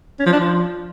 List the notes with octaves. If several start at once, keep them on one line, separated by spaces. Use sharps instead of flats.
C#4
F3
D4
F3